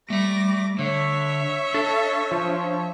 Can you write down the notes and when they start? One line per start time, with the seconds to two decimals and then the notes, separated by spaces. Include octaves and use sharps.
0.10 G3 A3 E5 D6 A#6
0.79 D3 C#5 E5 C#6
1.74 D4 A4
2.31 F3